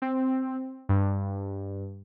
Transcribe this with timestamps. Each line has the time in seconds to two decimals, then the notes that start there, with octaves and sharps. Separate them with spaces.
0.02 C4
0.89 G2